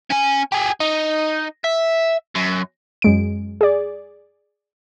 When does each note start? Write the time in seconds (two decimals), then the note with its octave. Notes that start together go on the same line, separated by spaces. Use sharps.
0.10 C#4 G#5
0.52 G4 G#4
0.80 D#4
1.64 E5
2.35 F#2
3.02 F#2 G#3 D7
3.61 G#4 D5